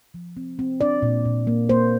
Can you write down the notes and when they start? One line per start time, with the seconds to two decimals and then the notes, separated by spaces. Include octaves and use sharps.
0.14 F3
0.37 C4
0.59 C4
0.81 D4 D5
1.02 A#2
1.25 A#2
1.47 A#3
1.69 A#3 C5